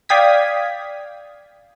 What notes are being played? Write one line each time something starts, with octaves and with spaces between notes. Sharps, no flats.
D5 F5 G5 D#6 G#6 B6